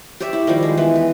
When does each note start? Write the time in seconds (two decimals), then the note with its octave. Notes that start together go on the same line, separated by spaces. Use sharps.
0.20 G4 C#5 D5 E5
0.33 E4
0.47 D#3 F3 G3
0.63 G#3
0.77 E3 B3
0.95 B4